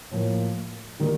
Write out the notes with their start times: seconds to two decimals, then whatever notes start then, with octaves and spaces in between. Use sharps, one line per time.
0.11 A2 F3 A#3
1.00 D#3 G3 A#3